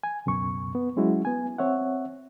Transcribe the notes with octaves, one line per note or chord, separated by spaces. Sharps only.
G#5
C#2 F#2 B2 C#6
B3
F#3 G#3 C#4 E4 F#4
B3 G#5
C4 C#5 E5 F#5